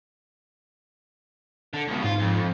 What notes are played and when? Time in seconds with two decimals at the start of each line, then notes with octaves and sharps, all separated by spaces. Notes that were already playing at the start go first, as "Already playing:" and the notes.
1.74 D3
1.88 C#2 B2
2.04 G#2 F4
2.20 F2